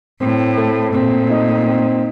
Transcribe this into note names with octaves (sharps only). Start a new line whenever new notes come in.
A2 C4
A3
A#2 C4
D#4
C4